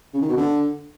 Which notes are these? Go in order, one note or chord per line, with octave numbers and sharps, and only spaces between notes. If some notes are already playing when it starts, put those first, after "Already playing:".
C#3
D#3
B2
D3